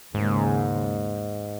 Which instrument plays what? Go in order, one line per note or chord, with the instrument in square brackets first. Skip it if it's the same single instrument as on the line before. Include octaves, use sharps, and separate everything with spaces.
[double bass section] D#2 C#3 G#3 [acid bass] G#2